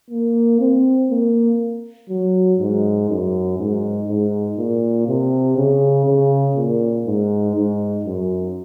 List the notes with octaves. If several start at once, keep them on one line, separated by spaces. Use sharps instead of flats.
A#3
C4
A#3
F#3
G#2
F#2
G#2
G#2
A#2
C3
C#3
C#3
A#2
G#2
G#2
F#2